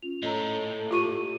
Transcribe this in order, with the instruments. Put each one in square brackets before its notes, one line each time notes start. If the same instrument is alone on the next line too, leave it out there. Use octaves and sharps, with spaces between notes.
[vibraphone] C#4 F4 [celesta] F7
[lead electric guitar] A2 [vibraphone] A4 C#5 E6 [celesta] D#5 A#5
[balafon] F4 C#6 [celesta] G4 D#7